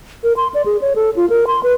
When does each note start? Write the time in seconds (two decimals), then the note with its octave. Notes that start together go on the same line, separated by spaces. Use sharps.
0.24 A#4
0.37 C6
0.54 D5
0.66 G#4
0.81 C#5
0.96 A4
1.16 F4
1.30 A#4
1.47 C6
1.63 B4